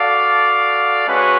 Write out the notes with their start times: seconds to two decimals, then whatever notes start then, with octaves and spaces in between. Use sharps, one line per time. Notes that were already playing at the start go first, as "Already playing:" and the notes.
Already playing: F#4 A4 D5 F5
1.07 G#3 C#4 F#4 B4